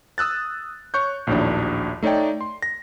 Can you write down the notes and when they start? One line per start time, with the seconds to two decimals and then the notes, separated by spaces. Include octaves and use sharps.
0.18 D#6 E6 F#6 A6
0.94 C#5 C#6 F#6 G6
1.27 A#1 D#2 A2 F#3 D4
2.03 A3 D#4 C#5 D5 G5
2.41 C6
2.62 A#6